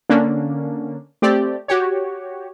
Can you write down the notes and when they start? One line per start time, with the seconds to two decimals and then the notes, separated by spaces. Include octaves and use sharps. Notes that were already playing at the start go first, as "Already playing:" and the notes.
0.09 D3 A#3 C#4 D4
1.22 A3 C4 G4 D5
1.68 F#4 G4 C#5